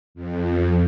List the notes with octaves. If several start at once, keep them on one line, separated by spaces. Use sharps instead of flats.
F2